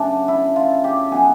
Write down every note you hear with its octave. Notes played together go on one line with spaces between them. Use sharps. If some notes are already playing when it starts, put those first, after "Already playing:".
Already playing: C#3 F#3 A3 D4
E4
F4
G4
D#3 F#3 B3 G#4